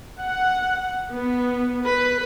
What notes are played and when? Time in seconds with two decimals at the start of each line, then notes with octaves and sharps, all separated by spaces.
0.21 F#5
1.14 B3
1.86 B4